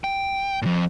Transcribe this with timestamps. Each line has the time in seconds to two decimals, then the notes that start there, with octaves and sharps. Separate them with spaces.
0.04 G5
0.62 F2 A2